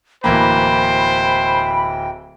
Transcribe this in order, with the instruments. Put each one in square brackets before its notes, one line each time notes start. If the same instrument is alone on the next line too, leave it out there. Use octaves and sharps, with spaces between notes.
[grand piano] D1 E3 A#3 [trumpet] C5 [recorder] G5 [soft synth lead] B5